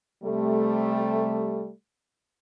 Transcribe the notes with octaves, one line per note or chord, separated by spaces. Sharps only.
C3 G3 A3